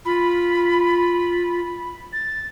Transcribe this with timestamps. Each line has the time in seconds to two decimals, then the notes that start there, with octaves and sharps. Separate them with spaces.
0.05 F4 B5
2.13 A6